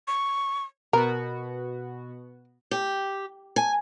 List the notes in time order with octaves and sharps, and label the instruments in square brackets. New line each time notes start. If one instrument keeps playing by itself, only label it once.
[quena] C#6
[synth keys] B2 B3 F#4 [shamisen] A#4
[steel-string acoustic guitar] G4
G#5